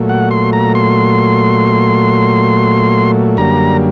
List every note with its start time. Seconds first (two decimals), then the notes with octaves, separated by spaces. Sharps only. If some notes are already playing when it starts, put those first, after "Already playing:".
Already playing: A#2 F#3 A3
0.09 F#5
0.31 C6
0.53 A#5
0.75 C6
3.37 F#2 D3 G3 A#3 A#5